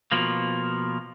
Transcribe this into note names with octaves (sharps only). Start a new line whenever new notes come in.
B2 F3 A#3